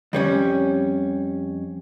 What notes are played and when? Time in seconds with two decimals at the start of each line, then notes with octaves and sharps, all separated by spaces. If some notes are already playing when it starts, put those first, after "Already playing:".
0.13 F2 G3 C#4